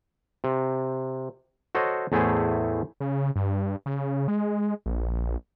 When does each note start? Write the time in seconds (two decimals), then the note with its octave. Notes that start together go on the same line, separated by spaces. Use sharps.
0.44 C3
1.75 F#4 A4 C5 C#5 D#5
2.12 E2 A2 A3 E4 G#4 C5
3.00 C#3
3.36 G2
3.86 C#3
4.28 G#3
4.86 A#1